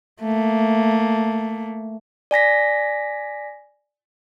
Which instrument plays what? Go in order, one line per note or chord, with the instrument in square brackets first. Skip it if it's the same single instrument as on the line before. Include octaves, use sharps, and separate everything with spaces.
[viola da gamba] A3 A#3
[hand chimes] D5 G#5 A#6 B6